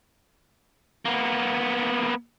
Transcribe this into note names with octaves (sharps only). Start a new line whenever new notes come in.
A#3 B3